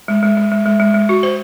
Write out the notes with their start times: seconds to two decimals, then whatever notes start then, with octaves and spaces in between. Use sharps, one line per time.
0.08 G#3
0.23 G#3
0.37 G#3
0.52 G#3
0.66 G#3
0.80 G#3
0.94 G#3
1.09 F#4
1.23 C5